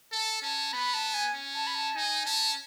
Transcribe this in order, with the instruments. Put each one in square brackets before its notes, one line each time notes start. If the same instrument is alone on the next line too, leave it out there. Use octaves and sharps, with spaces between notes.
[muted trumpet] A4 [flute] A5
[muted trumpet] C#4 [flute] A5
[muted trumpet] B3 [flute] B5
[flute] A5
G#5
[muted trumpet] C#4
[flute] A5
B5
A5
[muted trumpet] D#4 [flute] G#5
[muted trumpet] C#4 [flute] A5